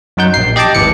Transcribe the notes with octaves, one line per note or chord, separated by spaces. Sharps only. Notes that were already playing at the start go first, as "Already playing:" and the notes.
F#2 F#3 D#4 F#5 G6
A#1 C7
G4 D#5 G5 A5 D6
G#1 D#2 E3 C#7